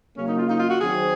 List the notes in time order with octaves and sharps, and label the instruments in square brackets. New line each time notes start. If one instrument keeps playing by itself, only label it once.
[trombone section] C#3 F#3 A#3 [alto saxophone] C#4
[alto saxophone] D#4
F4
D#4
F4
F#4
[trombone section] D#3 F#3 C4 [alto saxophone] G#4